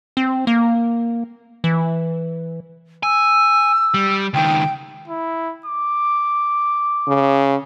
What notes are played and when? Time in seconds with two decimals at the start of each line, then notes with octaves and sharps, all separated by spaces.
0.17 C4
0.47 A#3
1.64 E3
3.03 G#5 E6
3.94 G3
4.33 C#2 D#3 G5
5.08 E4
5.66 D6
7.08 C#3